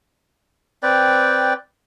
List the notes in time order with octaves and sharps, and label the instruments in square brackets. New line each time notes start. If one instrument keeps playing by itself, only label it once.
[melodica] C4 B4 D5 G5